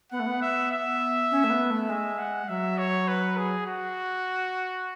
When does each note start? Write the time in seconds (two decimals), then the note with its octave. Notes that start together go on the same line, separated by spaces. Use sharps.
0.12 B3 F#5
0.19 A3
0.26 B3
0.42 E5
0.71 E5
1.31 C#4
1.44 A3
1.50 B3
1.70 A3
1.89 G#3 E5
2.18 F#5
2.48 F#3 E5
2.78 C#5
3.08 B4
3.37 G#4
3.66 F#4